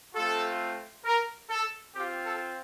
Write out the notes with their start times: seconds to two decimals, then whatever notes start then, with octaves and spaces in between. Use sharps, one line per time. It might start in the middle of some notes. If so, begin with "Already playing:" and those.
0.15 A3 C4 F4 A4
1.05 A#4
1.50 A4
1.95 C4 G4
2.00 F4
2.25 A4